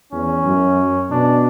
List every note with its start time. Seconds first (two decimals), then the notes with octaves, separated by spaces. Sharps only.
0.12 E2 C#4
0.45 F#2
1.11 B2 D4